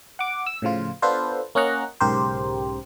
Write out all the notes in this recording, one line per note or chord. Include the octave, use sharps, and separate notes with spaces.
F#5 D6
E6
A2 C#3 F3 F4
B3 D4 F4 A4 B4 C5
A#3 C#4 D#5 F#5 A#5
B1 G#2 C#3 G4 A#4 C5